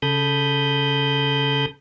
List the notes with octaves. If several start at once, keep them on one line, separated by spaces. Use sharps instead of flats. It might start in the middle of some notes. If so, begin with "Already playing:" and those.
C#3 A4 B5 D#6 G6